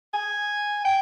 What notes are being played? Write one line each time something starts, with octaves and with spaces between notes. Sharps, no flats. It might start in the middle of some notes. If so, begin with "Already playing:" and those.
G#5
G5